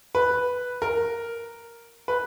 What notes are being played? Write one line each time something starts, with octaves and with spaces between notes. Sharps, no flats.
B4
A#4
B4